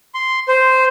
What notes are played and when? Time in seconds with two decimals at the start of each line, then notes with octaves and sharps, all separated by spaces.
0.15 C6
0.48 C5